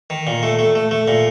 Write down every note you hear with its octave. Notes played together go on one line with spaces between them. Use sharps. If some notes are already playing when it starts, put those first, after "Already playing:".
D#3
A#2
A3
A3
A3
A3
A#2